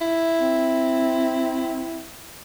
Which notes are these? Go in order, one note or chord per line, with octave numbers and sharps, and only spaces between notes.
E4
C4